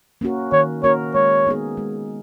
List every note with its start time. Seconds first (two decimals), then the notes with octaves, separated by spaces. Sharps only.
0.21 A#3 C#4 F#4 A#4
0.52 D#3 C#5
0.83 A#3 C#4 F#4 A#4 C#5
1.15 G#3 C#5
1.47 B3 D#4 G#4
1.77 G#3